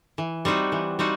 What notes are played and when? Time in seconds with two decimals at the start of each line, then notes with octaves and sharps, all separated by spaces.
0.18 E3
0.45 G3 C4 D#4 F#4
0.72 E3
0.99 G3 C4 D#4 F#4